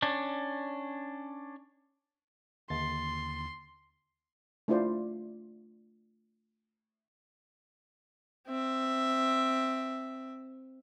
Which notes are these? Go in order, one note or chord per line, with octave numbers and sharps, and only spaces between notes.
C#4 D4
D#2 D3 C6 A6
A3 D4 E4 F4 C5 D5
C4 E5